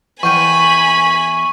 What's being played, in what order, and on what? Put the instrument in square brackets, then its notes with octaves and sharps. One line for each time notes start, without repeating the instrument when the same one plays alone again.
[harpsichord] E2 G5 [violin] G#5 B5 [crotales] C#6 D#7